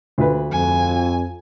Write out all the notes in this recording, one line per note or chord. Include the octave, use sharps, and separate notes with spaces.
D2 F4 B4
F2 G#5